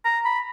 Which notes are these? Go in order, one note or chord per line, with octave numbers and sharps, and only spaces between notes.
A#5
B5